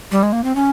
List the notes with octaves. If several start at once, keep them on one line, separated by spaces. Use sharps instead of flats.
G3
G#3
A#3
C4
C#4